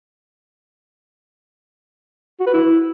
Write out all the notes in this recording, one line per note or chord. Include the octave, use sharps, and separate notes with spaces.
F#4
B4
E4